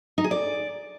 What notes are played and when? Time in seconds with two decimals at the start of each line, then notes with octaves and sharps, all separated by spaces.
0.18 D#4
0.24 G#4
0.31 D5